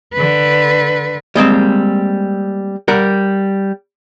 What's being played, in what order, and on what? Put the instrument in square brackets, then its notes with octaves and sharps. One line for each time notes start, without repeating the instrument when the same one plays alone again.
[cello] D3 B4
[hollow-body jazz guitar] G3 G#3 A#3 C4
G3 A#4 F#5